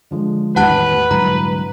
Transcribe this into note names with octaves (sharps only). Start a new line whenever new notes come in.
D3 F3 G#3
E2 A2 D#3 G3 B4 F#5 A5 F#6
C2 G#2 D3 F#3 A#5